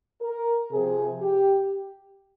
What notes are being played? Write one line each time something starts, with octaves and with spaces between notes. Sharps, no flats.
A#4
C3 F3 C4 G#4
G4